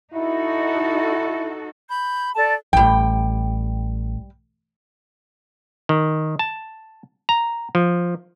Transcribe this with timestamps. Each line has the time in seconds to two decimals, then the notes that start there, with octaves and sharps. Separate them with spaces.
0.14 D#4 E4 F#4 A4
1.89 B5 G6
2.35 A4 D5 A5
2.73 A1 G3 G5
5.89 D#3
6.39 A5
7.29 A#5
7.75 F3